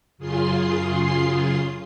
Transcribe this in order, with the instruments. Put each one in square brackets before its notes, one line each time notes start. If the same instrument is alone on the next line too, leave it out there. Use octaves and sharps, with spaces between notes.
[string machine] F#2 C#3 F4 G#4 C6 C7